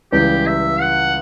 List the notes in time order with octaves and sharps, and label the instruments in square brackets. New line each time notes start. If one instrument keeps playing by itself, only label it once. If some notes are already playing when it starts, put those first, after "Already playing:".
[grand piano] C#2 C#3 E3 G3 [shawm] G4
[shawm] E5
F#5